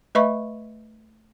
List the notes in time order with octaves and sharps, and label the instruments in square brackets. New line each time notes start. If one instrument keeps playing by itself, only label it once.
[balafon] A3 B4 D#5 E5 B5 C#6